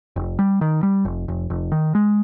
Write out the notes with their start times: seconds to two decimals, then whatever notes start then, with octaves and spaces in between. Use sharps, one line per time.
0.16 F1
0.39 G3
0.61 D#3
0.83 G3
1.05 F1
1.28 F1
1.50 F1
1.72 D#3
1.95 G#3